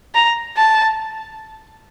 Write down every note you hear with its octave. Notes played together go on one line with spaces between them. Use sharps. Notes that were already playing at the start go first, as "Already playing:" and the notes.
A#5
A5